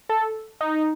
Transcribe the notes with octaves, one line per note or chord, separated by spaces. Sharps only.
A4
D#4